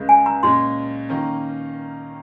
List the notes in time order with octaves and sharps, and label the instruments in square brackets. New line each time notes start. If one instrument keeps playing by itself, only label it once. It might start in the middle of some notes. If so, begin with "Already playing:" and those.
Already playing: [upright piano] C#2 C#3 G#3
[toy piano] G#5
A#5
[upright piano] A#2 G#3 C#4 [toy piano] C6
[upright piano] D#3 A#3 C#4